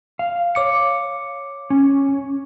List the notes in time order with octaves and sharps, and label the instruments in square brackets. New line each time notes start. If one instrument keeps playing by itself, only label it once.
[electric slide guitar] F5
[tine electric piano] C#5 D6 C#7
[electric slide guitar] C#4